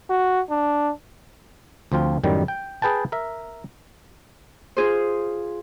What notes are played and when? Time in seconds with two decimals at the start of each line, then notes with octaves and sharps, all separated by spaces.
0.10 F#4
0.50 D4
1.92 D2 F3 C4 F4
2.24 F#2 A2 D#3 F#3 G3
2.48 G5
2.82 G#4 B4 G5 A5
3.12 A#4 E5
4.77 F4 G#4 C5